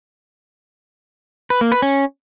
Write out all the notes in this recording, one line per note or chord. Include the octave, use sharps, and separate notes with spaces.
B4
A#3
B4
C#4